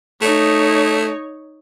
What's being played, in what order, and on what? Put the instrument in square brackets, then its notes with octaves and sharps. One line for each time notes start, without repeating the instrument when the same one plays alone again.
[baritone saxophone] A3 [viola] D#4 C#5